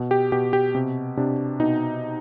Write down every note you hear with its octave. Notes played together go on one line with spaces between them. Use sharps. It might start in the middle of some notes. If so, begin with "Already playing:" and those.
Already playing: B2
G4
B2 G4
G4
C3
C3 D4
B2 D#4